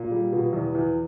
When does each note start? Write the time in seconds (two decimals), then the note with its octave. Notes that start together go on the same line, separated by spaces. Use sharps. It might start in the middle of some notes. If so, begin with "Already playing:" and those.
Already playing: A#2
0.11 G3
0.32 B2
0.53 E2
0.75 E2